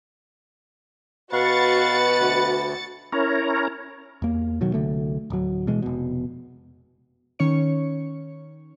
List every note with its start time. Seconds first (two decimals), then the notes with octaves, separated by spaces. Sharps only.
1.33 B2 F#4 B4 F5 F#5 C#6 A6 C#7
2.18 D2
3.12 C#4 E4 A#4 C#5 A#5
4.22 E2 A#3
4.61 B2 D#3 F#3
4.74 C2 D3 F#3 A3
5.30 D1 F#3
5.67 B2 E3 G#3
5.82 F1 B2
7.39 D#3 C#4 C#5 C#7